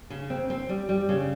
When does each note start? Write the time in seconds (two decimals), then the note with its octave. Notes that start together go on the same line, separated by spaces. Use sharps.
0.10 C#3
0.30 C4
0.50 C4
0.69 G3
0.89 G3
1.09 C#3